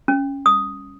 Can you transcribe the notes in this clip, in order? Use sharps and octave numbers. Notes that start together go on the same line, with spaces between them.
C#4
D#6